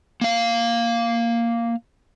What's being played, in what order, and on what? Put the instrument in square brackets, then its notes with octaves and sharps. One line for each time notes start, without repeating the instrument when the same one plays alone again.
[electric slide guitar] A#3 F5